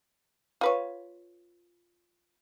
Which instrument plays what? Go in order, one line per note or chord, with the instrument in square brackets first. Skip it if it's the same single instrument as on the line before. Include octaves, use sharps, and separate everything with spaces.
[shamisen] F4 B4 C#5